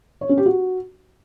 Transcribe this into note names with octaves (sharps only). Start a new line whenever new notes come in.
C#5
C#4
G4
F#4